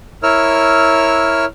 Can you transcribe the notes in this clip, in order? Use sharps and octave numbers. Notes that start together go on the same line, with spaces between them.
E4 A#4 C#5 E6 F6